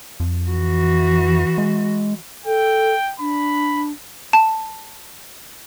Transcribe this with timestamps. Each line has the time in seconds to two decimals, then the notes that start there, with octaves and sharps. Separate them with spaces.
0.20 F2
0.50 E3 F#4
1.58 G#3
2.45 A4 G5
3.19 D4 B5
4.33 A5